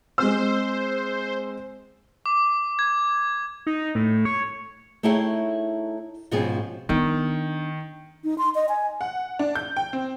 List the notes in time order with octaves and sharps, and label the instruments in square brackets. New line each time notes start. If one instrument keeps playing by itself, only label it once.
[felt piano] G#3 C4 E6 [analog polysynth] C5
[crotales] D6
G#6
[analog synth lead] D#4
A2
C#5
[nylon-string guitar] A3 D#4 E4 G#4 C#5 G5
G#2 B2 F3 C4 C#4 G#4
[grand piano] D#3 [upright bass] B3 D4
[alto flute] D#4
C6
D#5
G#5
[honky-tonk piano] F#5
D4
G6
G5
C4